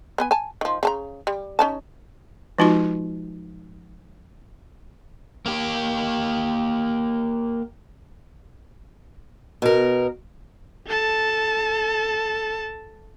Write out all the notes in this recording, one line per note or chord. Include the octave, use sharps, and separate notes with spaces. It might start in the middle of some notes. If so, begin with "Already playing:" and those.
B3 B4 G#5
G#5 A5
D#3 F3
C#3 A5 A#5
G3
C#4 D#4 A5
F3 G#3 D#4 F4 F#4 C6
A#3 G4
B2 A#4
A4 A5